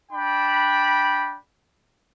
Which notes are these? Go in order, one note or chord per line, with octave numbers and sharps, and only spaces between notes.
D4 G5 B5